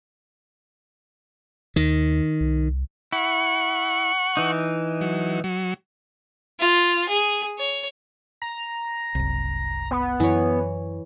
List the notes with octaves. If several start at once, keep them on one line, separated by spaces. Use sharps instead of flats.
D#2 D#3
C2
E4 F#5 C#6
E3 D#4
F#3
F#3
F4
G#4
C#5
A#5
F#1 C2
B3
F#2 E3 C#5